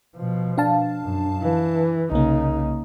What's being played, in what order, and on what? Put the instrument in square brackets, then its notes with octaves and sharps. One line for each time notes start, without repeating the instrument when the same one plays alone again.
[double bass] B2 F3
[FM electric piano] D4 F5 A5
[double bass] F#2
E3
[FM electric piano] C2 A#3 [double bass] C#3 D#4